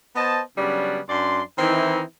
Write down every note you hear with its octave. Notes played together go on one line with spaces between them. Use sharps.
B3 C5 D#5 A5
C#3 F#3 G3 B3 C#4 D4
F#2 D4 D5 C6
D#3 E3 C4 D#4 E4